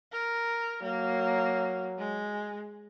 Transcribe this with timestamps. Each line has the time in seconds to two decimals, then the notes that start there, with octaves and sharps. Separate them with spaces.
0.12 A#4
0.83 F#3 A#3
1.98 G#3